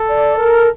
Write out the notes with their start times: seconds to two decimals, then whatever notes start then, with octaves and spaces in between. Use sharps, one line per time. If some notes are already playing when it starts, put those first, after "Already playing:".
Already playing: A4
0.09 D5
0.37 A#4